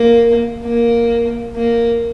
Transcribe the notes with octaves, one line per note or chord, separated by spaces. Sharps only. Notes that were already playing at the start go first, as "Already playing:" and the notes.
Already playing: A#3
A#3
A#3